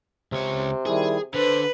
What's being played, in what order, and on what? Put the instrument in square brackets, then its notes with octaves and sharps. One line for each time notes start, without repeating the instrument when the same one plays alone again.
[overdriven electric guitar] C#2 C#5 [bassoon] C3
[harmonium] D#3 G3 E4 [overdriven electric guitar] G#4
[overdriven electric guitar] D3 D4 [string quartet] B4 [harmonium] C5